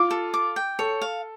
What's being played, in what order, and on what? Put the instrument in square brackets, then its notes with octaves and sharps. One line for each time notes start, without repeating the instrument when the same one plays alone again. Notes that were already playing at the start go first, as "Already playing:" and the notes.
Already playing: [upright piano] F4 [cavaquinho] D6
[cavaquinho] A4
D6
G5
[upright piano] A4 [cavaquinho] C#5
[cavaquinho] F5